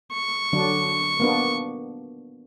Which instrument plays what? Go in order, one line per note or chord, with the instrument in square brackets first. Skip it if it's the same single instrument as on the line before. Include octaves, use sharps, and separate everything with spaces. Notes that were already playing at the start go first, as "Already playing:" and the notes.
[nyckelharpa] C#6
[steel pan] D3 F#3 D4
A#3 B3 D4